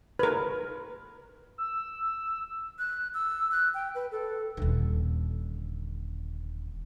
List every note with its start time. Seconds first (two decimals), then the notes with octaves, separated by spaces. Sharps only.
0.19 A#4 B4
1.58 E6
2.79 F#6
3.14 E6
3.51 F#6
3.74 G5
3.95 B4
4.12 A4
4.57 D#1 D3